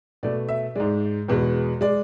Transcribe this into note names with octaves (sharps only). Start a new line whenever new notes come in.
B2 A3 D5
E5
G#2 G#3 D5
E2 B2 G#3
G#3 D5